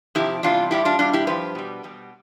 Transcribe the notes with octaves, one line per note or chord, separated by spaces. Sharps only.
F2 C3 F3 E4 G4
E2 C3 E3 G3 D4 F4
A2 G3 E4 G4
D4 F4
B2 G3 D4 F4
E4 G4
G2 F3 G4 B4
B2 G3
B2 G3